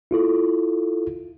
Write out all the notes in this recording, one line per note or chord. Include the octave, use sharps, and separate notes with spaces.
E4 F4 A4